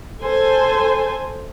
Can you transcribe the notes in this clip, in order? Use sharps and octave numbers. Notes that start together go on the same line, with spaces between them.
A4 C5 G#5